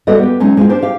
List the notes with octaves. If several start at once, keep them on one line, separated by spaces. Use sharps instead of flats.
G3 A#3 F#4 A4 B4 D#5
B3 G4
F#3 G#3 C#4 D#4
G#3 C4 F4
D4 G4 C5
G4 F5